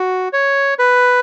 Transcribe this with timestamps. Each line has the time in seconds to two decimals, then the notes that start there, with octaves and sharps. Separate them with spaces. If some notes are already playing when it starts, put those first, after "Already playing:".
Already playing: F#4
0.33 C#5
0.79 B4